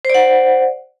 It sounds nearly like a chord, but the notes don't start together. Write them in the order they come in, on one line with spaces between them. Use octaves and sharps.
C5 D5 F#5